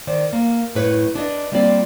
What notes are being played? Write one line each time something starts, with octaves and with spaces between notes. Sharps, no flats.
D#3 C5 D5
A#3
F#2 A2 B4 C#5
D4 B4 D#5
G3 A#3 C4 F4 D5